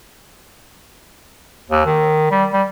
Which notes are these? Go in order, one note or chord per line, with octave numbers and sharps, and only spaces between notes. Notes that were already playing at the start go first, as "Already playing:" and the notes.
D#2
D#3
G3
G3